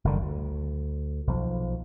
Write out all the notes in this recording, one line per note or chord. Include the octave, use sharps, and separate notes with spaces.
F#1 D3 D#3 G3
D2
B1 F3